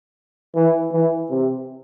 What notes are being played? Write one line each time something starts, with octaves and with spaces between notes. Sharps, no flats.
E3
E3
C3